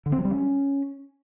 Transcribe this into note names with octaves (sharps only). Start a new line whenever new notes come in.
D3
C4
F#3
G3
C#4